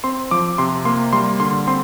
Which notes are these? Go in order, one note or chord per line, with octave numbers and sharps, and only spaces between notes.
C4 C6
F3 D6
C3 C6
A#3 C6
G3 C6
D3 C6
C4 C6